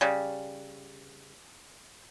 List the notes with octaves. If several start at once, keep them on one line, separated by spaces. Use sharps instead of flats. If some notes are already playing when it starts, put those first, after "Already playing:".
C#3 G3